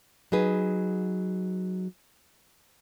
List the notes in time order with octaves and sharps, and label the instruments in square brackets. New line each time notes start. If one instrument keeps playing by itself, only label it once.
[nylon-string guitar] F#3 D#4 G#4 B4